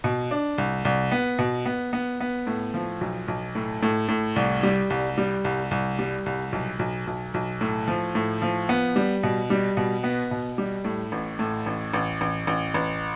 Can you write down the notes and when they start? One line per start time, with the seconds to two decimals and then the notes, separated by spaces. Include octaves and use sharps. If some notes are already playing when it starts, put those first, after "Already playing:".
0.04 B2
0.31 D4
0.58 C2
0.85 C2
1.12 B3
1.39 B2
1.66 B3
1.93 B3
2.21 B3
2.47 A2
2.74 F3
3.01 B1
3.28 B1
3.55 A2
3.83 A2
4.09 A2
4.36 C2
4.63 G3
4.90 C2
5.18 G3
5.45 C2
5.71 C2
5.99 G3
6.26 C2
6.52 B1
6.79 B1
7.07 B1
7.34 B1
7.61 A2
7.88 F3
8.15 A2
8.42 F3
8.69 B3
8.96 G3
9.23 B2
9.50 G3
9.77 B2
10.04 B3
10.31 B2
10.58 G3
10.85 A2
11.12 A1
11.39 A2
11.66 A1
11.94 A1
12.21 A1
12.47 A1
12.74 A1